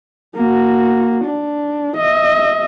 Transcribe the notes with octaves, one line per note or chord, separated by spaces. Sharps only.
A#3 F#4
D4
D#5 E5